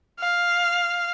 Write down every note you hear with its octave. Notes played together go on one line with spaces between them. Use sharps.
F5